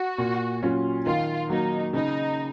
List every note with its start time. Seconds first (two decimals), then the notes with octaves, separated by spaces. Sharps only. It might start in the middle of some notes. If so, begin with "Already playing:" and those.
Already playing: F#4
0.18 A#2
0.63 F#3 C#4 F4
1.06 D#3 F4
1.50 F#3 A#3 D#4
1.93 C#3 D#4